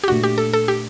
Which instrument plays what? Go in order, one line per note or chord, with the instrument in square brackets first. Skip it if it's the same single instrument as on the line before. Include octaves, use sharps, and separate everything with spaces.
[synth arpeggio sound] G4
[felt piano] A#2 A3 D4 [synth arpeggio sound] F#4
[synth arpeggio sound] G4
A4
A4
G4